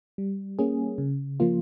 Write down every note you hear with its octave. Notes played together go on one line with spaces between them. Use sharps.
G3
A#3 C#4 G#4
C#3
F3 A#3 F4